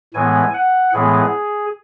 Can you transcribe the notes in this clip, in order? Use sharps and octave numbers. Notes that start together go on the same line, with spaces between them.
A2 E3 G#3 B3 G#5
F#5
A2 E3 G#3 B3 G#4